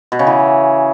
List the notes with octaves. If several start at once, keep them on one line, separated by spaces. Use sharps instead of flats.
B2
C#3
E3